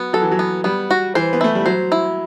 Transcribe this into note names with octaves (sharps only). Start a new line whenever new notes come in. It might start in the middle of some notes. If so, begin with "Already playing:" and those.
Already playing: F#3 B3
F#3 A4
E3
F#3
B3
G3 B3
F#4
E3 C5
B3
A3 E4
G3
F#3 C5
E4